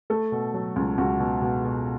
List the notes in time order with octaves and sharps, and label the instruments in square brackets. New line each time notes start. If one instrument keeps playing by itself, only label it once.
[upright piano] A3 A4
B2
F#3
C#2
C#2 F#4
B2
B2
B2